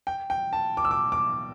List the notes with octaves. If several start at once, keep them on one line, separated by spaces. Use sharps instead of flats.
G5
G5
A5
D6
E6
D6
D6